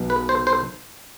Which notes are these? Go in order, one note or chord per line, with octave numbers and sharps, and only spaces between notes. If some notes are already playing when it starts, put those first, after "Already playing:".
Already playing: B1 B2
B4
C5
C5